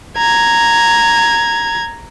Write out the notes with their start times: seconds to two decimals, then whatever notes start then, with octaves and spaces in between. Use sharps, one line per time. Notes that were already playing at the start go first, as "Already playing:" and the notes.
0.18 A#5 G#6